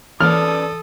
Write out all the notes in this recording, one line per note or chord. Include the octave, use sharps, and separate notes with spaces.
E3 C#4 A4 B4 D5 D#6 F6